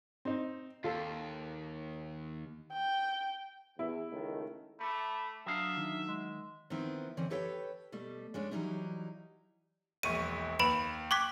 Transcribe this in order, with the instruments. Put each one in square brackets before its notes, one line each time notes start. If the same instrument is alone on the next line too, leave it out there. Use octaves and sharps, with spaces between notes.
[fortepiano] C4 D#4
[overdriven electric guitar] D#2 [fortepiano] F4 A4
[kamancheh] G5
[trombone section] E2 [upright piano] E4
[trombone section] C#2 D#3 A3
[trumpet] A3 [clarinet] B5 [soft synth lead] D6
[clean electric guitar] F#3 F5 [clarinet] D4 [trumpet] E5 [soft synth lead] D#6
[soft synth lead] D#3
[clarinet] G#3
[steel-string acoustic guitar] D#3 B3 C4 E4
D3 E3 C4 C#4
G4 A4 B4 C#5 F5 G5
B2 G3 A3
G#3 C#4 D4
E3 F#3 G3 D#4 E4
[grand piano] E1 A#1 C#6 [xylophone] D#7
[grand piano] D#2 [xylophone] B4 B5 D7
[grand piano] G5 F#6 G#6 [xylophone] C#6 D6 B6